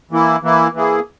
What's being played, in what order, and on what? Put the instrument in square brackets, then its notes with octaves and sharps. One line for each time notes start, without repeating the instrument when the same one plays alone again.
[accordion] E3 A#3 E4
E3 A#3 E4
E3 A#3 E4 G#4